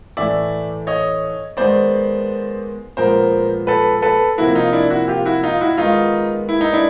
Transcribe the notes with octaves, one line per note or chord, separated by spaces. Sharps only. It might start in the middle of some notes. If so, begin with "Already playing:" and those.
A2 E3 A3 D5 E5
C#5 D#5
D#3 G#3 B3 C5 D5
A#2 F3 G#3 B3 A#4 C5
A4 B4
A4 B4
C3 F3 A#3 E4 F#4
D#4 F4
D4 E4
E4 F#4
F4 G4
E4 F#4
D#4 F4
E4 F#4
D#3 G#3 B3 D#4 F4
E4
D#4
D4 E4